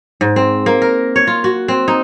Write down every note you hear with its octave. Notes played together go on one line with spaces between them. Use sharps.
G#2
C4
A#3
A#4
C#5
F4
F#4
C4
D#4